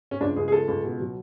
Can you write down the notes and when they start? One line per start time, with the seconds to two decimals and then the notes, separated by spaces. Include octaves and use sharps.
0.11 C#4
0.21 C#2 D4
0.36 C#2 G#4
0.48 G#4
0.52 C#2 A4
0.68 C#2
0.84 B2
1.00 F#3